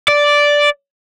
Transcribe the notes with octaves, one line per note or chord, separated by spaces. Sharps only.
D5